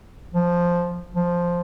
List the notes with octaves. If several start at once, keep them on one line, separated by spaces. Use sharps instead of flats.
F3
F3